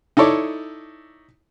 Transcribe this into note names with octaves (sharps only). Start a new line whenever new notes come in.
D#4 E4 A4 C#5 D5